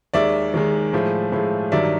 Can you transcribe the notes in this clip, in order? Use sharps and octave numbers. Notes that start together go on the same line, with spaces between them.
D#2 D#3 G#3 D5 E5
D#2 D#3 G#3
A2 F3 G#3
A2 F3 G#3
G2 D#3 F#3 D5 E5